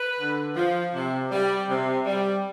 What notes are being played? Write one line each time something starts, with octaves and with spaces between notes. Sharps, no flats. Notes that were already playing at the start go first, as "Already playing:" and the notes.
Already playing: B4
D3
F3
C3
G3
C3
G3